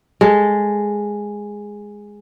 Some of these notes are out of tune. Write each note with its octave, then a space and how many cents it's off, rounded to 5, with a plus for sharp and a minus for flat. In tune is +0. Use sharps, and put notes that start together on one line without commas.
G#3 -5 A4 +0